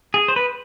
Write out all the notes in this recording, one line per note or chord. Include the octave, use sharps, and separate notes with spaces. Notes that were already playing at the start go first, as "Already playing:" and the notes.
G#4
C5
B4